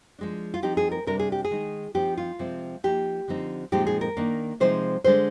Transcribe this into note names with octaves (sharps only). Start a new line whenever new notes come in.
F3 G#3 D4
F4
F3 C4 D#4 G4
G#4
A#4
C3 G3 D4 A#4
G#4
G4
G#4
D#3 G#3 D#4
F3 C4 D#4 G4
F4
C3 F3 G#3 C4
F3 A#3 D#4 G4
D3 F3 C4 D#4
A#2 F3 G#3 C4 D#4 G4
G#4
A#4
D#3 A#3 D4
C3 F3 G#3 C4 D#4 C5
D3 G#3 D4 C5